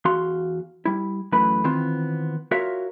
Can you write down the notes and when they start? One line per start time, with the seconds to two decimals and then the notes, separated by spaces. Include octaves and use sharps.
0.05 E2 F#4 F5 C6
0.85 G3 E4
1.32 F#2 E3 A3 B4 B5
1.64 D#3 E3 B3 C4 F4
2.51 F4 F#4 A#4 C#5 E5 F5